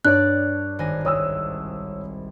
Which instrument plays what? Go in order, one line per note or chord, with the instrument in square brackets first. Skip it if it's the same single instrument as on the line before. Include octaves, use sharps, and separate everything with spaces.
[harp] G2 D5 [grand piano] D4 C#5 [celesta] F#6
[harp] G#1 G#5 A#6
[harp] C2 [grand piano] C#5 D#6 E6